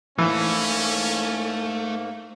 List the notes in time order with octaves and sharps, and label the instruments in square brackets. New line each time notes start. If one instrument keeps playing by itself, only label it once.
[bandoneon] G#2 A#3 [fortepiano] E3 [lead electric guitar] A3 [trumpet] C#4